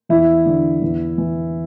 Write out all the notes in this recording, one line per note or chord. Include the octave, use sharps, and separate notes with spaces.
E2 E4
D3
E2
E3